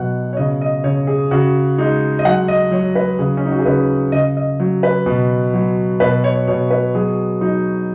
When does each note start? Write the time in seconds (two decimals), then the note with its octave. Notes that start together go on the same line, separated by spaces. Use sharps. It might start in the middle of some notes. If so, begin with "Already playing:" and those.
Already playing: B2 F#3 F#5
0.33 C#5
0.37 C#3 D#5
0.61 D#5
0.84 C#3 C#5
1.07 G#4
1.31 C#3 F#4
1.78 G#3 D#4
2.19 D#5
2.25 F#3 F#5
2.48 D#5
2.71 F#3 C#5
2.95 B4
3.19 C#3 G#4
3.37 C#4
3.45 D#4
3.51 F#4
3.59 G#4
3.65 C#3 B4
4.12 C#3 D#5
4.37 D#5
4.60 F#3
4.83 B4
5.06 B2
5.54 F#3
6.00 B2 B4
6.24 C#5
6.47 B2 C#5
6.71 B4
6.95 F#3 G#4
7.41 F#3 D#4